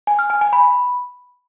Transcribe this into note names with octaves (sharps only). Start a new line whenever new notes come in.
G#5
F6
G#5
G#5
B5